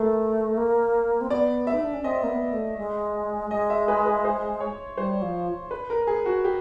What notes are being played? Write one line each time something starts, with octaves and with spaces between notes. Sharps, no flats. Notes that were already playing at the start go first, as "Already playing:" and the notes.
Already playing: A3 A#4
A#3
C4
B3 D5
E5
D#4
D4
C#4
C4 D#5
A#3
B3
A3
G#3
G#3 D#5
E5
B4
B4
C5
C#5
G3 C5
F3
B4
A#4
G#4
F#4
G4